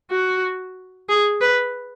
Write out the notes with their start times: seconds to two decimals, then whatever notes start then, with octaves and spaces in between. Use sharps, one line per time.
0.11 F#4
1.09 G#4
1.41 B4